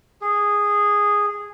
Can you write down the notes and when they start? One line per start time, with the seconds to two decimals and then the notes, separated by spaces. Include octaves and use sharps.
0.22 G#4